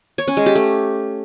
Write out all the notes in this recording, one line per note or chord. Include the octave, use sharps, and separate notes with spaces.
C#5
C#4
G#3
G4
A3